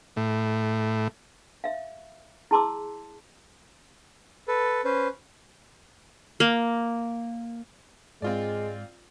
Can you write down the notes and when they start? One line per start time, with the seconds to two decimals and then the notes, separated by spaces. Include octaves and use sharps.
0.16 A2
1.64 E5 F5
2.51 E4 G#4 A5 C6 D6 E6
4.48 A4 B4
4.85 C#4 B4 C5
6.40 A#3
8.22 G#2 G#3 C4 F4 D5